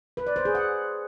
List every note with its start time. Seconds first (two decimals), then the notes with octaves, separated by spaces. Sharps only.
0.17 B4
0.27 D5
0.36 C5
0.45 G#4
0.55 F#5